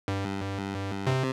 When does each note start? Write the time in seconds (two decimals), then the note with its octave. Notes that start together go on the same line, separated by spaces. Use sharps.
0.08 G2
1.07 C3